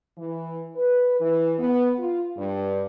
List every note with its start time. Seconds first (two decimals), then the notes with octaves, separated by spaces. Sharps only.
0.18 E3
0.76 B4
1.20 E3
1.59 B3
1.99 F4
2.37 G2